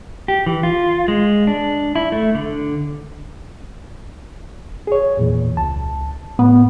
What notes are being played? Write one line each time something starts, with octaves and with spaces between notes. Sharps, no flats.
G4
E3
F4
G#3
D4
E4
A3
D3
G#4 C#5
E2 A#2 E3
C#2 A5
A2 B3